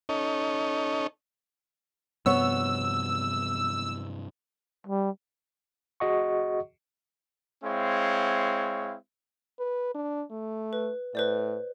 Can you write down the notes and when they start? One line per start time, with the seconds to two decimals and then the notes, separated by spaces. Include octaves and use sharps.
0.09 C#4 D#4 A4 C#5 D#5
2.26 G2 C3 F3 B3 C#5 E6
4.87 G3
6.00 F#4 G#4 D#5 F#5 C#6
7.64 G#3 C4 E4 C#5 F5
9.59 B4
9.94 D4
10.30 A3
10.73 B4
11.15 A2 B4 C5 D5